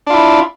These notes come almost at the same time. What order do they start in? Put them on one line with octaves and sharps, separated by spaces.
D4 F4 E4